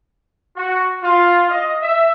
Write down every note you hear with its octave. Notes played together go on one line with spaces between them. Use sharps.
F#4
F4
D#5
E5